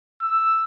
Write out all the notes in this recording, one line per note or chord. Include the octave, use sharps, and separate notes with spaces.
E6